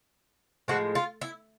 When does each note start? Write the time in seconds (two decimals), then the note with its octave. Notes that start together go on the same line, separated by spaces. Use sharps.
0.68 A2 F3 G#3 F#4
0.95 F4
1.21 E4